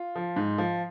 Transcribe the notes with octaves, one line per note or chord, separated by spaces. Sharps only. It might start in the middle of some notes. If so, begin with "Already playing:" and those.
Already playing: F4
F3
G#2
F3